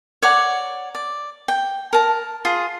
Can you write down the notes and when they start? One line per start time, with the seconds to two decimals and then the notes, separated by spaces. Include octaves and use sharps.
0.22 C#5 D5 F#5 A#5
0.95 D5
1.48 G5
1.93 A#4 A5
2.45 F4 G#4